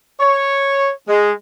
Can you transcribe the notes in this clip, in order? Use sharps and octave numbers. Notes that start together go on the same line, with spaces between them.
C#5
G#3